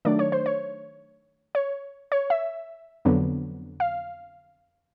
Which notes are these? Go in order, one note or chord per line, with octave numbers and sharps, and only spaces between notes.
D#3 F#3 A3 D4 D5
C#5
C5
C#5
C#5
C#5
E5
F2 D3 F#3 B3
F5